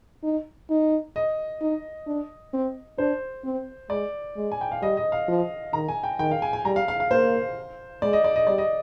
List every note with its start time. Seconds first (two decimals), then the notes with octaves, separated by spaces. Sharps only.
0.23 D#4
0.70 D#4
1.16 D#5
1.61 D#4
2.07 D4
2.53 C4
2.98 D4 C5
3.44 C4
3.90 G#3 D5
4.36 G#3
4.52 G#5
4.61 G5
4.72 F5
4.82 G3 D#5
4.97 D#5
5.12 F5
5.28 F3
5.73 D#3 A#5
5.88 G#5
6.04 G5
6.19 D#3 G5
6.31 F5
6.42 G#5
6.53 G#5
6.65 G3 A#5
6.76 F5
6.88 F5
7.00 F5
7.11 A#3 C5
8.02 G#3 D5
8.13 D#5
8.24 D5
8.36 D#5
8.47 G3 D5
8.58 D#5